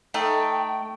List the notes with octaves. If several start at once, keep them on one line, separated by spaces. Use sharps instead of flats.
A3 D#4 G5